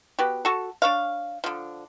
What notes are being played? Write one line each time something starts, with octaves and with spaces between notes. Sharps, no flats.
B3 F#4 G4
F#4 A4
D4 C#5 F5
D3 F3